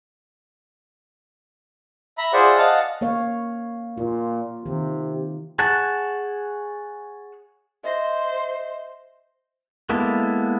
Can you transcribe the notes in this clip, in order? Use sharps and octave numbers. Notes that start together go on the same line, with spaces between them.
E5 A#5 B5
F4 G#4 C5 D5 E5 F#5
D#5 F5 F#5 A5
A#3 C#5 F5
A#2 F4
C3 D#3
G#4 C#5 F#5 A5
C5 D#5 E5 A#6
G#3 A#3 B3 E4 A4